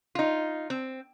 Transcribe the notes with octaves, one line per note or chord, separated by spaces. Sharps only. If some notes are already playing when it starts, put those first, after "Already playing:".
D#4 F4
C4